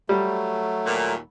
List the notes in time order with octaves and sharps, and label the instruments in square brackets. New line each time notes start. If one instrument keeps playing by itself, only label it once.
[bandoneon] F#3 A3 [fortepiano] G3
[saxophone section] D#2 A#2